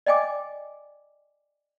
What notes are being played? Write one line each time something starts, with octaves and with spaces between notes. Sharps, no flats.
D5 D#5 G5 G#5 D6